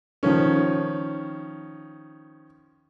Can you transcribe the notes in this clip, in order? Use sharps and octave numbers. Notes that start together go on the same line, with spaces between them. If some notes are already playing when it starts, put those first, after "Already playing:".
D#3 F3 C#4